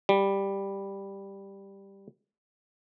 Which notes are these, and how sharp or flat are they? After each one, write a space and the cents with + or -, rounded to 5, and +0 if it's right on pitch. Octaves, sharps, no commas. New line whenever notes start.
G3 +5